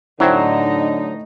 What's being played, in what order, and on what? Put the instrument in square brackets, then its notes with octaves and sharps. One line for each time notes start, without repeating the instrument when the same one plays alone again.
[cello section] A2 D#4 [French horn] D3 [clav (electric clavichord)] F#3 [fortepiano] E4 C5 G5